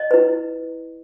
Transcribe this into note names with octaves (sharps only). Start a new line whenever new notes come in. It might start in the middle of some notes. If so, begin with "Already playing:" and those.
Already playing: D#5
E4 B4